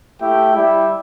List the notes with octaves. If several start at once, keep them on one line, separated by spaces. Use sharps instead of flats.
A3 E4 G4 E5 G5
G3 E4 G4 E5